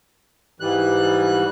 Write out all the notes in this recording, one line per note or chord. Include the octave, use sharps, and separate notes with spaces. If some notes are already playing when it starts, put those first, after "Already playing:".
G#2 E3 G3 F#6